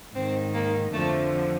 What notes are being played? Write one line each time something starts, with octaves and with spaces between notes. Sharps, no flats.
G#2 D#3 C4
A#3
F2 D3 F3 A3